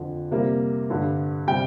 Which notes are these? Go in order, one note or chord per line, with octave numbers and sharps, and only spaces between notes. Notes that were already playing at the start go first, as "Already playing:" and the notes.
Already playing: F2 D3 F3
C3 G3 A#3
G2 D3 G3
C3 G3 G5